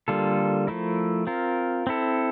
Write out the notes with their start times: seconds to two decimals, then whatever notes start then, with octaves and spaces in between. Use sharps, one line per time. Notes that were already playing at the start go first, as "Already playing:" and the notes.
0.08 D3 G3 A#3 F4 A4
0.67 F3 A3 E4 A#4
1.27 C4 F4 A#4
1.87 C4 E4 A4